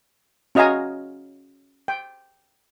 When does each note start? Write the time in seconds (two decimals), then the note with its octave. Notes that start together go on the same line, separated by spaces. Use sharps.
0.55 C#4 F#4 D#5 F5 G#5 A#5
1.88 G5